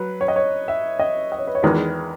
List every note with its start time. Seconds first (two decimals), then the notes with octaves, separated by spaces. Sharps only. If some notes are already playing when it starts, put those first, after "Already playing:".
Already playing: F#3 B4
0.21 C#5
0.28 D#5
0.36 C#5
0.68 E5
0.99 D#5
1.32 D#5
1.39 C#5
1.47 B4
1.55 C#5
1.63 E2 D#3 G#3 B4